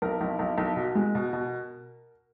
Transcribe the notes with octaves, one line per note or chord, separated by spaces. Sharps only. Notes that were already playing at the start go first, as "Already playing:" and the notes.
B1 A#4
B1
B1
B1
B2
G#3
B2
B2